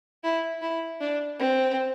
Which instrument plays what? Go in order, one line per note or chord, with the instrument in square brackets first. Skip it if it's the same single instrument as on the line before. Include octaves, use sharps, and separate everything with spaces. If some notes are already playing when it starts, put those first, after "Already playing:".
[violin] E4
E4
D4
C4